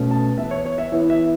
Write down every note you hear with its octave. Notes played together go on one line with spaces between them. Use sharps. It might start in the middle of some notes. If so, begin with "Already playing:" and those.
Already playing: B2 A3 C#4
A5
E3 B3 E4 E5
C#5
C#5
E5
E3 B3 E4 C#5
E5